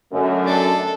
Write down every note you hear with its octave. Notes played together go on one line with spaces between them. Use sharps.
F#2 D3 A3 D#5
D4 A4